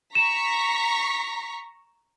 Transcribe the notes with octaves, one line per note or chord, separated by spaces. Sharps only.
A#5 C#6 B6 E7